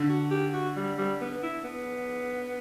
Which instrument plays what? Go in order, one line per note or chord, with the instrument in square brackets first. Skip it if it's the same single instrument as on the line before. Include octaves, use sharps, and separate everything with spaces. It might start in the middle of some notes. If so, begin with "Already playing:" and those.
Already playing: [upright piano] D3
[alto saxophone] F#4
G4
F#4
G3
G3
B3
E4
B3